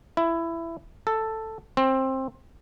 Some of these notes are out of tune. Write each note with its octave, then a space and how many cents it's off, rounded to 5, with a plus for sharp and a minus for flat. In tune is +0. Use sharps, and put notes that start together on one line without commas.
E4 +15
A4 +5
C4 +20